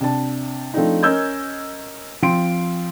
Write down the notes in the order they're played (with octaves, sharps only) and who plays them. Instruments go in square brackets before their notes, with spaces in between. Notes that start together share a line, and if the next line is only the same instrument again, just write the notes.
[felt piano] C3 D4 A5
F3 A3 C4 D4 D#4
C#4 A#4 D#5 E6 G6 G#6
F3 C4 C6 D7